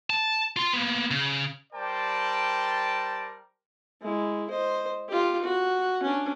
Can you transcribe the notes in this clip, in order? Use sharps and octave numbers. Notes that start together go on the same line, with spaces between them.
A5
F4 C6
A#3 B3
C#3
G3 A#4 C5 D5 G5 A5
G#3 E4
C5 D#5
F4 G4
F#4
C#4 D4